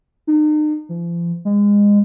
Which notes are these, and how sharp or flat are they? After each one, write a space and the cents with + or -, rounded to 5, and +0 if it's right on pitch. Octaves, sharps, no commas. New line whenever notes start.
D#4 -40
F3 -40
G#3 -25